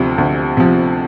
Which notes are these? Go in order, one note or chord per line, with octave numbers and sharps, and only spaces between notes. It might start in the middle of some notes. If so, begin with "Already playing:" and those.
Already playing: D2 C3 F3
D2
C3 F3